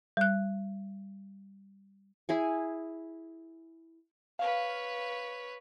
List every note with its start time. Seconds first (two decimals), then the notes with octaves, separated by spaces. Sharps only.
0.17 G3 F#6
2.29 E4 G#4 G#5
4.39 B4 C#5 F5